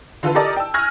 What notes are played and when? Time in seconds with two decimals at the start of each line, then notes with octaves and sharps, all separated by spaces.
0.23 D3 F4 A4 B4
0.35 G4 A4 A#4 D5 D#5
0.56 G5 A5 E6
0.74 G#5 C#6 F6 F#6 G#6 A#6